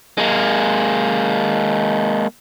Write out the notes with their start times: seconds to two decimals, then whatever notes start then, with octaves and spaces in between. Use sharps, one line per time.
0.18 G#3 A#3